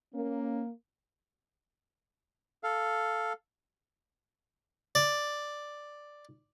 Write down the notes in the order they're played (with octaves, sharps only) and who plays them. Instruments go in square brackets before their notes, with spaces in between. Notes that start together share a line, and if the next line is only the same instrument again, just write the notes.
[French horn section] A#3 [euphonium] C#4
[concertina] A4 F5
[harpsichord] D5